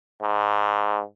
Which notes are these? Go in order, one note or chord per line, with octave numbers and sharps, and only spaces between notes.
G#2